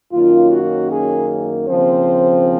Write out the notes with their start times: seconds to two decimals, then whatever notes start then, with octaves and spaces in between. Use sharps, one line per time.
0.12 F#2 D#3 A#3 C#4 F4
0.51 F#4
0.90 G#4
1.68 D#2 C#3 F3 C4 C5